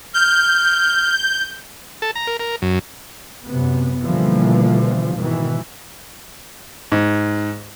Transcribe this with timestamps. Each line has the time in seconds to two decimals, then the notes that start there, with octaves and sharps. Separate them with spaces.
0.14 F6 G6
2.02 A4
2.16 A#5
2.27 A#4
2.40 A#4
2.62 F#2
3.48 F#2 C3 B3
4.04 B2 D3 E3 F3 G3 A#3
5.16 G#2 B2 D#3 E3
6.92 G#2